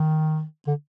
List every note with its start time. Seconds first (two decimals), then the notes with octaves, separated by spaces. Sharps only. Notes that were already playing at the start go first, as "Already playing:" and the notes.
Already playing: D#3
0.67 D3